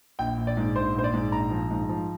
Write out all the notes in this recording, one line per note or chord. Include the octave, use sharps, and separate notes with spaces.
A#1 G5
A#1
D5
G#2
A#1 C5
A#1 C5
D5
G#2
A#1 A#5
F3
G#2
F3